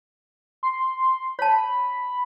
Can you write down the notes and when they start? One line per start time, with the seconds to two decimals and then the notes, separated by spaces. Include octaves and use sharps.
0.63 C6
1.39 C#5 A5 B5